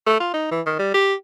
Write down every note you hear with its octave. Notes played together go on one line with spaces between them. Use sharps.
A3
F4
D#4
E3
D#3
G3
G4